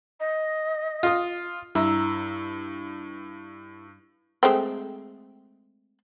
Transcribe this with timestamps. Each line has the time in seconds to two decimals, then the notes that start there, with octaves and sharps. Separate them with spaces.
0.20 D#5
1.03 F4 D#6
1.75 G2 E4 A#5 E6
4.43 G#3 A3 C4